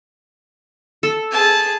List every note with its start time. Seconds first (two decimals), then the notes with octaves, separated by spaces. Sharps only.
1.03 A4
1.32 G#4 A5